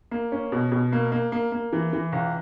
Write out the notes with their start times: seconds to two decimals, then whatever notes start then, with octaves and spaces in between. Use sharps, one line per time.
0.11 A#3
0.32 C#4
0.52 B2
0.72 B2
0.93 A#3
1.12 A#3
1.32 A#3
1.52 A#3
1.73 E3
1.93 E3
2.12 C#2